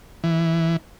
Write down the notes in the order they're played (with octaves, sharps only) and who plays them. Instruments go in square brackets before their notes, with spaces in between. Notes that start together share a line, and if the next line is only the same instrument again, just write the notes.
[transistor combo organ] E3